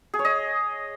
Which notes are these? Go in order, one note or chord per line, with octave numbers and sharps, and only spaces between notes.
G#4
C#5
D#5